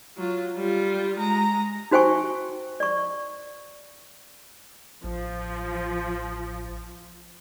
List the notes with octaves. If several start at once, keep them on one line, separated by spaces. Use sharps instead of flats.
F#3 F4
G3 F4
G#3 A#5
D#4 F#4 C5 G5 G#5 C#6
D5 C#6
A1 F3